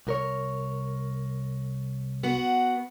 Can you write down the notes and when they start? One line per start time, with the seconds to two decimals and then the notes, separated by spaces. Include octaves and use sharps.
0.07 C2 A#4 C#5
2.23 B3 F#4